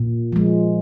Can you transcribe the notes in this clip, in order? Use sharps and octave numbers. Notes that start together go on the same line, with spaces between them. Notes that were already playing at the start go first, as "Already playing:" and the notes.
Already playing: A#2
F3 G#3